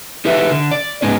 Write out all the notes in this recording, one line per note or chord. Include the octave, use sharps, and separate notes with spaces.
D#4 G4 A4 B4 E5
D3
D5
G#2 B3 C#4 D#4